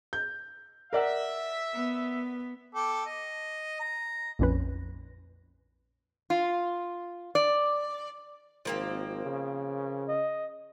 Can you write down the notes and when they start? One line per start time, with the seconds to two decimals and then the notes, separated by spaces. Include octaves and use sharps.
0.13 G6
0.93 A#4 D5 E5 F#5
1.73 B3
2.75 A4 G5 D6
3.06 D#5
3.80 A#5
4.39 A#1 F2 C#4 B4
6.30 F4
7.35 D5
8.65 G#1 F3 A#3 C4
9.25 C#3
10.08 D#5